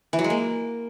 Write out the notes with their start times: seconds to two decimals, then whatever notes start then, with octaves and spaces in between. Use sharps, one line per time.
0.13 E3
0.19 F#3
0.24 G#3
0.30 A#3